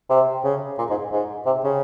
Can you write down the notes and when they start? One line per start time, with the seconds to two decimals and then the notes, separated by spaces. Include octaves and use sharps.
0.10 C3
0.44 C#3
0.78 A#2
0.90 G#2
1.12 G#2
1.46 C3
1.64 C#3